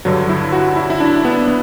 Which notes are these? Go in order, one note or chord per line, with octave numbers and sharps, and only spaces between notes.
G2 D3 F#3
E4
F#4
E4
E4
D4
B3
B3